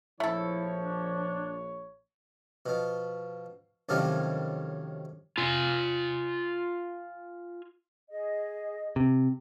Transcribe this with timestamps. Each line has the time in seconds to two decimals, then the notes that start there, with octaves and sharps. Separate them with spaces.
0.20 A#1 F3 A3 E4 A4 C#5
0.77 D4
2.66 B2 F3
3.89 F#2 A2 C3 D#3 F3 G3
5.38 F4 G#5
8.09 G#4 D#5
8.96 C3